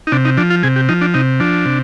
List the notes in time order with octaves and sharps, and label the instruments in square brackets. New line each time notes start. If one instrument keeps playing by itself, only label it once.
[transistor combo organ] D#4
C3 D4
D#4
F3 D4
F4
C3 G#4
G4
F3 D#4
D4
C3 D#4
F3 D4
C3